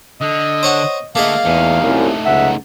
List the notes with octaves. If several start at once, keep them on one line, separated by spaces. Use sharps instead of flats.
D3 D#5
C5 C#5 F#5
D3 A3 A#3 G#4 D#5 F5
E2 A3 D#4
C2 F#2
C#2 E5 F#5